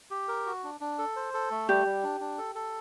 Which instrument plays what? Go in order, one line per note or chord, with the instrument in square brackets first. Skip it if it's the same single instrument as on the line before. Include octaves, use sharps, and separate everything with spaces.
[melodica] G4
A#4
F#4
D4
D4
A4
C5
A4
A3
[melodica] G3 [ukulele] G4
[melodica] G3
D4
D4
A4
A4